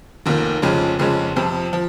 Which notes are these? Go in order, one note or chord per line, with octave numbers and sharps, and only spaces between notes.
F1 D#2 D#3 A#3
F1 F2 C#3 G#3 C#4
F1 F2 C#3 G#3 C#4
F2 C3 F3
F3